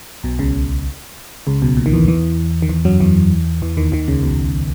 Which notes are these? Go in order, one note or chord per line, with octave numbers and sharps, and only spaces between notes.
B1 B2
C#2 C#3
C#2 C#3
B1 B2
A#2
D#3
E2 E3
E2 E3
D#3
E2 E3
F#2 F#3
E2 E3
E2 E3
D#2 D#3
D#2 D#3
C#2 C#3
B1 B2